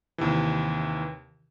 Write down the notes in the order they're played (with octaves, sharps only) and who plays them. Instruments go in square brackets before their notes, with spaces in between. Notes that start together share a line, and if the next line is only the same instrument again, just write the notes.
[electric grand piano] D#2 C3 E3